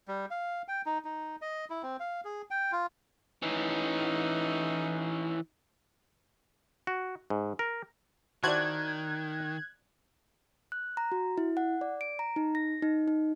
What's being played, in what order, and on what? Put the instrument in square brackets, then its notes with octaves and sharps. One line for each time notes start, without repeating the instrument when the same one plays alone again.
[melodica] G3
F5
G5
D#4
D#4
D#5
E4
C4
F5
G#4
G5
F4
[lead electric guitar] E3 C#4 [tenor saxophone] D#4
[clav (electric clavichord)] F#4
G#2
A#4
[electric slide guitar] D#3 [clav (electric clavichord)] E4 F#4 C5 [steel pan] D5 A5 [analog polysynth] F#6 G#6
[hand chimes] F#6
A#5
F#4
E4
F#5
D5
D7
A#5
D#4
A#6
D#4
D#4